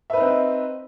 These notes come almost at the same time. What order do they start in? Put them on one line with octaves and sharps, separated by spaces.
E5 B4 D#4 C4